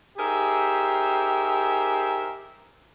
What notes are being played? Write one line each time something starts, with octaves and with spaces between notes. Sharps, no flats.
D#4 G4 G#4 A#4 C5 E5